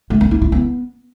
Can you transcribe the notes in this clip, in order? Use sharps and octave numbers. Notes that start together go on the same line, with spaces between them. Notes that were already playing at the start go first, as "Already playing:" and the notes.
A3
A#3
E4
E4
B3